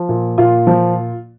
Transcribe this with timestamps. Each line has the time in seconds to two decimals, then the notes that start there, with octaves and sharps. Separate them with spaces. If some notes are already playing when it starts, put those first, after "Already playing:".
Already playing: F3
0.09 A#2
0.38 A#2 F4
0.67 F3